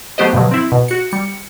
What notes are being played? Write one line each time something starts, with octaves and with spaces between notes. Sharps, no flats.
F#3 A3 B3 G4 C5 D#5
G2 B2 D3 F3 F#3
C4 E4
B2
F#4 C#7
G3 C#7